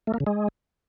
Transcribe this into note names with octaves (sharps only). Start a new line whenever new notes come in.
A3
A#3
C#3
G#3